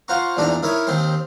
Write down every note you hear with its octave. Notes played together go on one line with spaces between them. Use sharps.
F4 C5 F#5 A#5 C#6
A#1 E2 D4 D#4 A#5
D#4 E4 A#4 C#5
D#2 D#3 C4 C6